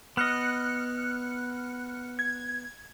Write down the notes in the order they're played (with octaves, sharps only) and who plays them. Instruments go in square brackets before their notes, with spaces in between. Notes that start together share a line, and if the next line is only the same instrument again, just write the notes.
[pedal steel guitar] B3 D#5 [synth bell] F6 F#6 C#7
[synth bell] G#6